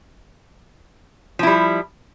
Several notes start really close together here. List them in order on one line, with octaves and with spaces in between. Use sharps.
F3 E4 G3